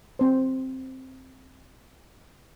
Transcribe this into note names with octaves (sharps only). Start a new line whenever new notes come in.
C4 C5